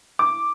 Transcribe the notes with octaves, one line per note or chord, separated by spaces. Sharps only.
D6